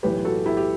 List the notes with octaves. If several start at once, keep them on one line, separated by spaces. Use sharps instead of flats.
B1 A2 E3 G4 B4
F#4 A4
E4 G4
G4